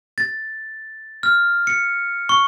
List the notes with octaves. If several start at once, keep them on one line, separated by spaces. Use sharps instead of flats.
A6
F6
C#7
C#6